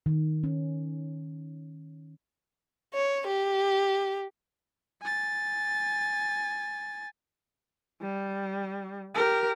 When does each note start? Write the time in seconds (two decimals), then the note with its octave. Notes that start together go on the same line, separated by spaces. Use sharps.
0.06 D#3
0.44 C#4
2.94 C#5
3.27 G4
5.01 G#5 A6
8.01 G3
9.15 G4 A#4